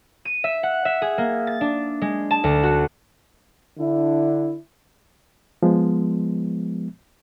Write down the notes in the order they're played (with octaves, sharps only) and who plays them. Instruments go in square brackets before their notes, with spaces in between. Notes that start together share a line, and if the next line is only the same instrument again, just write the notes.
[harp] D#7
E5
F#5
E5
G#4
A#3
A6
D4
G#3
A5
D2
F#4
[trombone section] D3 D4 E4
[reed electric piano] F3 G#3 B3